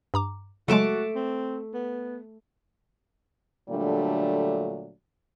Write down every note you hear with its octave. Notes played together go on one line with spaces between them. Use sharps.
G2 A#5 D6
C#3 F#3 G#3 A3 F#4 A5 D6
C4
B3
A#2 D3 F#3 G3 A3 D4